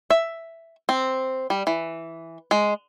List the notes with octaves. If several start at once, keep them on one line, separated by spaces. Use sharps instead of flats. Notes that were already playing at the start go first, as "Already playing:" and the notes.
E5
C4
G3
E3
G#3